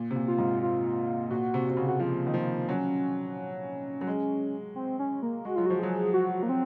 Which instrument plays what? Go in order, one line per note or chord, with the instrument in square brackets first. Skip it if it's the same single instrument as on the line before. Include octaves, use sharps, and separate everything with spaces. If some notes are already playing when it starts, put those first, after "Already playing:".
Already playing: [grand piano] A#2
C3
A#2
[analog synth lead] F4
[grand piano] G#2
[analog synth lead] F4
[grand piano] A#2 [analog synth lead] F#4
[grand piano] C3
C3
C#3
[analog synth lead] F#4
[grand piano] F3 [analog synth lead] F4
[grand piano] D#3
F3
[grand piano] F#3 [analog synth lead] C#4
[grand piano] F#3
G#3
[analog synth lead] C4
C#4
A#3
[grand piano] G#3 [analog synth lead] F#4
[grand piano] F#3 [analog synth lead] F4
[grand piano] F3 [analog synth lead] F#4
[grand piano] F#3 [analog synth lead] G#4
[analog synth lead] F#4
A#3
C4